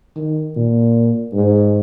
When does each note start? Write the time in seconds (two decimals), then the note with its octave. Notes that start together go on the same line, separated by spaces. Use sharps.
0.16 D#3
0.56 A#2
1.34 G#2